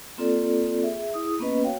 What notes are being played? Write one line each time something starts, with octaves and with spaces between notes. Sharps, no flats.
A#3 C4 F4 A4 D5
G#4 E5
E4 G#4 D#6
A#3 B3 C#4 B4 D#5
F#4 C#5 F5 G5